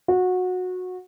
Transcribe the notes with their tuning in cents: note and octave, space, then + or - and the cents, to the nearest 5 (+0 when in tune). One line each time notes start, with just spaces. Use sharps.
F#4 -20